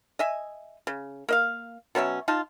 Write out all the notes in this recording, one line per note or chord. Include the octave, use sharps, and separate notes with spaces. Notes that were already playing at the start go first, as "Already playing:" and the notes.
D#5 E5 G#5
C#3
A#3 D#5 F5
B2 F#3 C#4 E5
D#4 F4 A5